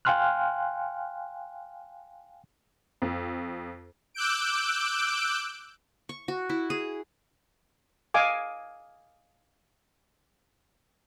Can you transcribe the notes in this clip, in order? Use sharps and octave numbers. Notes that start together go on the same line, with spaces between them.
F5 G5 G#5 C6 F6 F#6
F2
D6 E6 F#6 G6 D7
C#6
F#4
E4
G#4
D#5 F5 G#5 D6